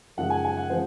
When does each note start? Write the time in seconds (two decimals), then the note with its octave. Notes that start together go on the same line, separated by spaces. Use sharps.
0.17 F#2 C#3 F3 G#3 F#5
0.30 G#5
0.45 G#5
0.57 F#5
0.70 F3 G#3 C5